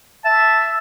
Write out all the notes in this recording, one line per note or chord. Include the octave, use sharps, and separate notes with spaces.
E5 A5